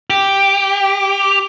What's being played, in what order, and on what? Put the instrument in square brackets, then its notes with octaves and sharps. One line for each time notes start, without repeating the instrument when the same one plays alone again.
[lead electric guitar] G4